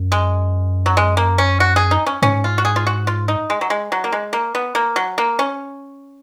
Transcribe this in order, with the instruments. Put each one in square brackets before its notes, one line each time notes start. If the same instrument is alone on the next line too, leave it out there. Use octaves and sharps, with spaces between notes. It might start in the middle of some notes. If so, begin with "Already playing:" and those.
Already playing: [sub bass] F#2
[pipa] G#3
F#3
G#3
A#3
C#4
F#4
G#4
D#4
C#4
[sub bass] G#2 [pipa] C#4
[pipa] F4
F#4
G#4
F4
F#4
F4
D#4
G#3
F#3
G#3
F#3
A#3
G#3
A#3
B3
A#3
F#3
A#3
C#4